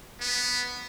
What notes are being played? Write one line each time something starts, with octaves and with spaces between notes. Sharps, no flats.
B3